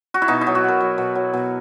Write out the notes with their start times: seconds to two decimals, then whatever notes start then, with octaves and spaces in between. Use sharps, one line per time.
0.14 F#4
0.22 E4
0.28 B2 D#4
0.41 E4
0.47 F#3
0.55 F#4
0.64 B2 A#4
0.81 F#3
0.98 B2
1.15 F#3
1.33 B2